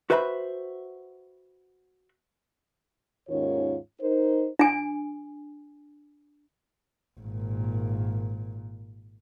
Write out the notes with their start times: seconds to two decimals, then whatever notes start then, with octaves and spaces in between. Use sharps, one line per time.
0.10 F#4 B4 C5 E5 A5 B5
3.29 D#2 G#2 D#3 C#4 F4 C#5
4.01 D#4 A#4 C5
4.59 D4 G#5
7.20 G#1 A#2